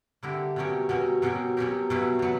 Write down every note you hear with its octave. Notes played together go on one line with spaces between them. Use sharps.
D3 A#3 E4 G4 A#4
B2 F#3 C#4 G4 A#4
B2 F#3 C#4 G4 A#4
B2 F#3 C#4 G4 A#4
B2 F#3 C#4 G4 A#4
B2 F#3 C#4 E4 B4
B2 F#3 B4